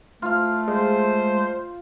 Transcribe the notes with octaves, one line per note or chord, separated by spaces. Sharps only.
A3 F4 F5
G#3 C5